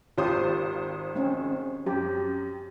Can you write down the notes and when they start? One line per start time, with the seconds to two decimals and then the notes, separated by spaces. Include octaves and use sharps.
0.18 G#1 F4 G4 C5 D#6
1.15 G#3 C4 C#4
1.87 F#2 G4